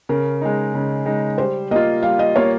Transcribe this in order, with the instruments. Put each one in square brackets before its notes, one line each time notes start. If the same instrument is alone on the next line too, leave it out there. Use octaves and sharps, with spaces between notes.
[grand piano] C#3 [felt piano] A#4
[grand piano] G#3 D#4
C#3
G#3 D#4
[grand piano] G3 [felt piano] C5
[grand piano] A#3 F4 [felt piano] D#5
[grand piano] G3 [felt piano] F5
[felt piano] D#5
[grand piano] A#3 F4 [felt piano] C#5